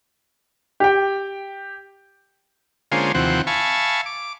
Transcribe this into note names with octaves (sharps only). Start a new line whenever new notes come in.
G4 G5
D3 G#3 A#3 C#4 F4 C5
D#2 C3 E3 F3 C4 F#5
E5 F5 G#5 A5 B5 C#6
D6